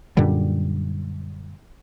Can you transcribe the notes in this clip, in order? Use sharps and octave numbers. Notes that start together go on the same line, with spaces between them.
F#2 A#2 D3 G3